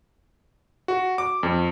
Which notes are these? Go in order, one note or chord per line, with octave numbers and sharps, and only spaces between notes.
F#4
D6
F2